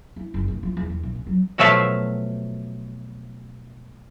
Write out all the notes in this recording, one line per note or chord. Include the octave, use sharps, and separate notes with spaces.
E4
F#1
A2
F3
E2
E2
A#1
C#3
F#3
B2 F3 F#3 A3 E5 F5